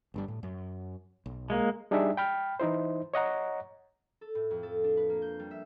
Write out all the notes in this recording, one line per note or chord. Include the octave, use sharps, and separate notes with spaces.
G1 G2 G3
A2
F#2
B1
G#3 A#3
G3 D4 D#4 G4 G#4 E5
G5 B5 F6
E3 D#4 E4 C5
C#5 D#5 F#5 A#5
A4
A2
F2
A4
D4
B4
A#3
G6
G3
E5